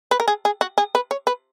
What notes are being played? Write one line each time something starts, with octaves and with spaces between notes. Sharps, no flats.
B4
A#4
G#4
G#4
F#4
G#4
B4
C#5
B4